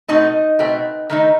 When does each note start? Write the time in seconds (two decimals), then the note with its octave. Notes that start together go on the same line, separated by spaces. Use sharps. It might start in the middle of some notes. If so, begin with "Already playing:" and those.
0.08 B2 A3 C4 D#4 D#5
0.59 B2 A3 C4
1.10 D#3 A3 D#4